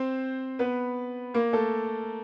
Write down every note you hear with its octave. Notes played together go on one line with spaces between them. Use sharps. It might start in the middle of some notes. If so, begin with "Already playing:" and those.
Already playing: C4 C5
B3 B4
A#3 A#4
A3 A4